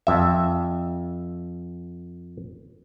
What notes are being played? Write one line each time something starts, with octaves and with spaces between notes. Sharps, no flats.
F2 E5